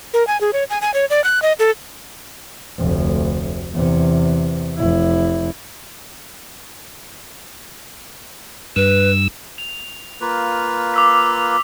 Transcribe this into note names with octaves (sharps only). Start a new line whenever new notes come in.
A#4
G#5
G#4
C#5
G#5
G#5
C#5
D5
F#6
D#5
A4
F1 D2
E2 C3
F1 E4
G2 B4 E6
F7
A#3 F4 B4
D6 E6 B6